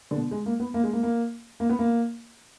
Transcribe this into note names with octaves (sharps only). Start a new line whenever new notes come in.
D3
B2
G#3
A#3
B3
A#3
G#3
A#3
A#3
A#3
B3
A#3